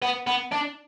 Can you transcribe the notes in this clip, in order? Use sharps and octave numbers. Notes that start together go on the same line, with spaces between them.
B3
B3
D4